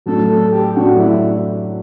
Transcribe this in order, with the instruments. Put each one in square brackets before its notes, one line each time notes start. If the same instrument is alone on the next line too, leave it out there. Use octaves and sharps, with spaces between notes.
[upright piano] A2 F#3 A3 D4 [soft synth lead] A4
[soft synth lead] A4
G4
[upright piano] A2 F#3 A3 D4 [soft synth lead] F#4
[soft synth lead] F#4
E4